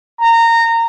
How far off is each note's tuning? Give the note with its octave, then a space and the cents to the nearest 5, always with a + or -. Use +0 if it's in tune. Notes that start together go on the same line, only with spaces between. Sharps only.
A#5 -20